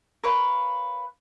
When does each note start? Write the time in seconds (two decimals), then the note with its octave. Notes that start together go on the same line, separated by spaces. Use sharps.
0.23 A#4 B4 C#5 F5